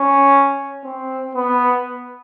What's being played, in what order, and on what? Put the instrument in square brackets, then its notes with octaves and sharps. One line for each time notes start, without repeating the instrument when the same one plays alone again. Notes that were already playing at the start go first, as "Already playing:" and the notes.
Already playing: [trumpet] C#4
C4
B3